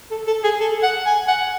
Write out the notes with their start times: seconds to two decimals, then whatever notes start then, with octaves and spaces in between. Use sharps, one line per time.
0.11 A4
0.27 A4
0.44 G#4
0.60 A4
0.83 F#5
1.06 G#5
1.28 F#5